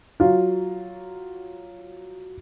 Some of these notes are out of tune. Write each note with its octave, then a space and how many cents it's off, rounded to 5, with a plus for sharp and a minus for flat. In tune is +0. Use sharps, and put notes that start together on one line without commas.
F#3 +5 F4 +0